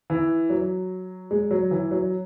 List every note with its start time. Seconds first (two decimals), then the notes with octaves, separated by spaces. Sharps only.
0.10 E3
0.50 F#3
1.31 G#3
1.51 F#3
1.71 E3
1.91 F#3